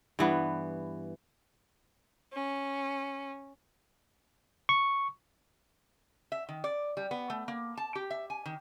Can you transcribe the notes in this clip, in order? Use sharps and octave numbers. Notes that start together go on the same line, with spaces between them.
G2 E3 B3
C#4
C#6
E5
D#3
D5
G3
B3
A3
A#3
A5
G4
E5
G#5
D#3